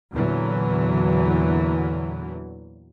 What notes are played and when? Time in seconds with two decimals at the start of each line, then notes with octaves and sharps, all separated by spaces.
0.13 E2 A#2 D3 E3 F#3